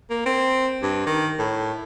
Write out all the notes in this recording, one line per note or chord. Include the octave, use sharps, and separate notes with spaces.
A#3
C4
G2
D#3
A2